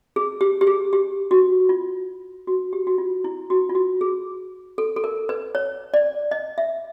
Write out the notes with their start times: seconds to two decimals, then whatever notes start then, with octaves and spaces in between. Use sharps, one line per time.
0.16 G#4
0.41 G4
0.61 G4
0.67 G#4
0.93 G4
1.31 F#4
1.69 F4
2.47 F#4
2.73 G4
2.87 F#4
2.98 F4
3.24 E4
3.50 F#4
3.69 F4
3.75 F#4
4.01 G#4
4.78 A4
4.96 A4
5.04 A#4
5.29 B4
5.55 C#5
5.94 D5
6.31 D#5
6.58 E5